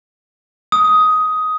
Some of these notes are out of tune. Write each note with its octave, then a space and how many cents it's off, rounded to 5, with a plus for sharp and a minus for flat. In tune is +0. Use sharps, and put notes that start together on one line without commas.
D#6 +10